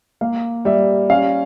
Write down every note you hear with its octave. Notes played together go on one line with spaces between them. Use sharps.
A#3 F5
G3 E5
C#4 F5